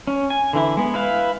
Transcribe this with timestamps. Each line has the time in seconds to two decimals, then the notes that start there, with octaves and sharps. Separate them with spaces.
0.07 C#4
0.30 G#5
0.53 D3 E3 E4
0.77 G#3 B3
0.94 E4 B4 F5